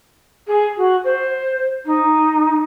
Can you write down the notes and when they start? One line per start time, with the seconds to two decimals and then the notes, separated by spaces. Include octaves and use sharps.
0.47 G#4
0.76 F#4
1.04 C5
1.85 D#4